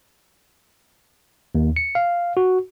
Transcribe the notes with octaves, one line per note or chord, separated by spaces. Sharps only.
D#2
C#7
F5
F#4